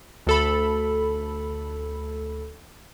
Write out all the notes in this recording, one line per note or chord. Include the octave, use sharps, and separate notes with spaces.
D2 A4 B5